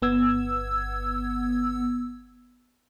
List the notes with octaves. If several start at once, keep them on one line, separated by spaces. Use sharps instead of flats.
G1 B3 E6 G#6